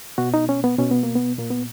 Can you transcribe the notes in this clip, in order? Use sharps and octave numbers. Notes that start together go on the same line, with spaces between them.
B2 F#4
D#4
C#4
B3
B2 C#4
B3
A#3
B3
A#2 A#3
B3